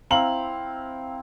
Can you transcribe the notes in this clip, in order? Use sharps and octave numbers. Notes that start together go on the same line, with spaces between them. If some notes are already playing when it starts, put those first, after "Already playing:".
C4 E4 F5 A#5 F#7